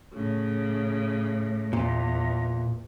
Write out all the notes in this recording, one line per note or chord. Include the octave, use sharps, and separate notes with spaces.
A2 C#3
E2 A#2